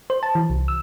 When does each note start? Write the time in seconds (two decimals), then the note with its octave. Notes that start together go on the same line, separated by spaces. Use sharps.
0.10 C5
0.23 A5
0.35 E3
0.50 C2
0.68 E6